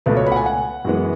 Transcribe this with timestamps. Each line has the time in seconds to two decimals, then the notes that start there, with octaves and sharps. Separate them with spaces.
0.06 C#2 B2 A3 B4
0.17 C#5
0.27 B5
0.32 F#5
0.36 G#5
0.46 F#5
0.85 F#2 E3 G#3 B3